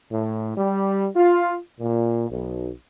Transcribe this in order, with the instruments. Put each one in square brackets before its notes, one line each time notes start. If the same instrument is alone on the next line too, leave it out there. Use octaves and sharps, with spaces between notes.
[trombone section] A2
G3
F4
A#2
B1